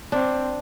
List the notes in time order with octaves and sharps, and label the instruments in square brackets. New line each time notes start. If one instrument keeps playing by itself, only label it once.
[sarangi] C4 [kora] D4